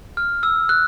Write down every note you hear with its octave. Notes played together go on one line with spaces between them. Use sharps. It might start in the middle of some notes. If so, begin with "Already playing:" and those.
F6
E6
F#6